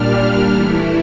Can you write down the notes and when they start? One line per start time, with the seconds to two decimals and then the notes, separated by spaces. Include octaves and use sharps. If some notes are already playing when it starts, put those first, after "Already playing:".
Already playing: A#2 G3 D4 F6
0.50 E3 A3 E4